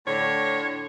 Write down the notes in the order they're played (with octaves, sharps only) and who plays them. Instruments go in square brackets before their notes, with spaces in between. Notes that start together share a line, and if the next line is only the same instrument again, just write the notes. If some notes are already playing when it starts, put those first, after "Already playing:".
[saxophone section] A2 D3 C#5